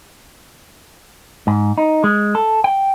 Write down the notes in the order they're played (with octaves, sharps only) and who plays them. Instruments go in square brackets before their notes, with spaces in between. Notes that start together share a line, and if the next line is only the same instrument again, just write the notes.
[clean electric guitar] G#2
D#4
G#3
A4
G5